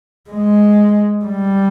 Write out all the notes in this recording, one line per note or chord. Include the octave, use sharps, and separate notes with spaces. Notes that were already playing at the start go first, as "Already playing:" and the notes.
G#3
G3